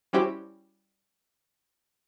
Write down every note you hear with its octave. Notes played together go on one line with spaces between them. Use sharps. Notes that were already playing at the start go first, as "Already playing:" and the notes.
G3 C#4 E4 F#4 G4 C5